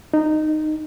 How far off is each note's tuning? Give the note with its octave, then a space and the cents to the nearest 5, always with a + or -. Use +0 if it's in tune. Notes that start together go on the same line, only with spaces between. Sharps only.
D#4 -15